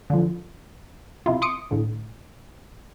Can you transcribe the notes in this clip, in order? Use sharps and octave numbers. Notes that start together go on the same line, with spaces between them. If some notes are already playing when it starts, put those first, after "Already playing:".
D3 F3
C3 E4 F4
C6 D6 D#6 C#7 D7
A2 D3